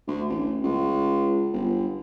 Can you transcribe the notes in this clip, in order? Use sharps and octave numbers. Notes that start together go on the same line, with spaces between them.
D2
A1
C#2
G1